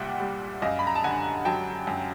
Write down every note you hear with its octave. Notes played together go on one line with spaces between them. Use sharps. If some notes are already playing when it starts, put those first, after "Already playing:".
Already playing: C2 A#2 G3 E5 F#5 G5
G3
F#2 D#5 F5
B5
A#5
A5
D3 F#5 G#5
F#3 G5 A5
F#2